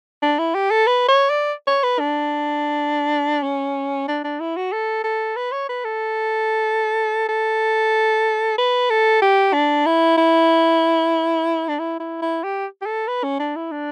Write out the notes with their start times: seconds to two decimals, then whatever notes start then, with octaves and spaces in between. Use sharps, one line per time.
0.23 D4
0.39 E4
0.55 G4
0.71 A4
0.87 B4
1.09 C#5
1.30 D5
1.67 C#5
1.84 B4
2.00 D4
3.43 C#4
4.09 D4
4.24 D4
4.40 E4
4.57 F#4
4.73 A4
5.04 A4
5.36 B4
5.52 C#5
5.69 B4
5.85 A4
7.29 A4
8.58 B4
8.90 A4
9.22 G4
9.54 D4
9.86 E4
10.18 E4
11.69 D4
11.80 E4
12.00 E4
12.22 E4
12.44 G4
12.82 G4
12.86 A4
13.08 B4
13.24 C#4
13.40 D4
13.56 E4
13.72 D4